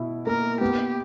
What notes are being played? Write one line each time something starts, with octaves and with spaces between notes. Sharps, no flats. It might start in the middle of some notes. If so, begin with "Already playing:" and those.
Already playing: B2 E4
A#3 A#4
B3 G4